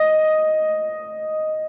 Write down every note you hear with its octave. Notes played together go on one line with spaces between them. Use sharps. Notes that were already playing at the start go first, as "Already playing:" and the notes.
Already playing: D#5